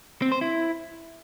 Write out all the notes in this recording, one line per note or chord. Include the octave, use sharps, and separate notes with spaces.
C4
C5
E4